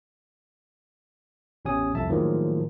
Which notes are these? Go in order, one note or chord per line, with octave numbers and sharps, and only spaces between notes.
A1 E2 C#4 G4 G#5 D#6
C2 F2 E5 A5
A2 D#3 F3 F#3 G#3 A#3